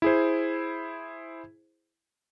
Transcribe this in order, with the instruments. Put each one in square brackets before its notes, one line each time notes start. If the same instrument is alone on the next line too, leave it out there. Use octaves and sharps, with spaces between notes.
[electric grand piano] E4 G#4 C5